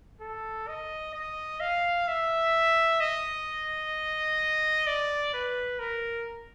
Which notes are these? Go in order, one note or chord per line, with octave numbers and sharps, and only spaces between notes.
A4
D#5
D#5
F5
E5
D#5
D5
B4
A#4